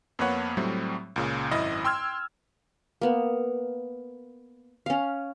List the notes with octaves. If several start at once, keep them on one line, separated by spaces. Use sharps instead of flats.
F2 A#3 B3 B4 C#5 F#5
A2 F#3 G3 A3 C4
C#2 A#2 C#3
G#1 F#2 E4 D#5
G5 C6 E6 F6 G#6
A#3 B3
C#4 F5